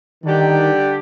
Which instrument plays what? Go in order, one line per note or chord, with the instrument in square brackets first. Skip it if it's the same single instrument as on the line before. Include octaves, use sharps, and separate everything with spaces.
[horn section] D3 G3 D4 G4 [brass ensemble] D#3